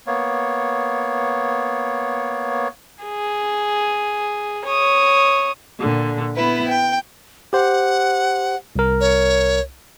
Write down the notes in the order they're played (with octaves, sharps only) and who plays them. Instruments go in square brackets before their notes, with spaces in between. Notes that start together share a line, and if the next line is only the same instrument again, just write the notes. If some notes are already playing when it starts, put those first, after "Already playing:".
[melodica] A#3 B3 C#5
[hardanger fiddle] G#4
C#5 D#6
[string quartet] A#2 D3
B3 E4 B4
G5
[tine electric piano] G4 C5 [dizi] F#5
[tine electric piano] C2 A#4
[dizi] C#5